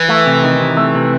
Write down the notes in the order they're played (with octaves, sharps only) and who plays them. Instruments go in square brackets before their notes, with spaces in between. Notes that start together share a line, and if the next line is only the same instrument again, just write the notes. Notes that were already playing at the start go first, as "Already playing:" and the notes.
Already playing: [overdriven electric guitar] E3
[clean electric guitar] A3
C3
D#3
C3
A3
C3